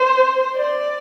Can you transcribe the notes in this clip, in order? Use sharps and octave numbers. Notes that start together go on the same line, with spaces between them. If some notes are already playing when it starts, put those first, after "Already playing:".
Already playing: C5
D5